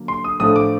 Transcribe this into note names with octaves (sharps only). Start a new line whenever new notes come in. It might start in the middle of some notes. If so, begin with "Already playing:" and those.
Already playing: D3 F#3 A#3
C6
D#6
A2 F3 A3 D4 D#6
D6